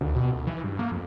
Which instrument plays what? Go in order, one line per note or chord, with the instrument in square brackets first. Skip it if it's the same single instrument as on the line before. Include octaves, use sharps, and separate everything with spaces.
[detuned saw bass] D2
B2
D2
E3
G2
A#3
F2